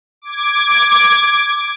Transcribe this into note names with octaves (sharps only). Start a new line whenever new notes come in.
D6 G#6